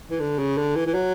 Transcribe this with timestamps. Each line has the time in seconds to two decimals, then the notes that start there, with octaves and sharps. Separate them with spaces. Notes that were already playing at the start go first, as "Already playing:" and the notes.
0.10 E3
0.20 D3
0.39 C#3
0.58 D3
0.76 E3
0.87 E3
0.94 F#3